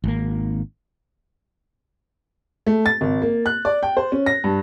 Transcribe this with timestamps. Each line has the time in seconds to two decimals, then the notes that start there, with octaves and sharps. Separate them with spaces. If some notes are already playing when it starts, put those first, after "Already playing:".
0.04 G#1 A#3
2.67 A3
2.86 A6
3.01 G#1
3.22 A#3
3.46 F#6
3.65 D5
3.83 G5
3.97 C5
4.12 C#4
4.26 A#6
4.44 G2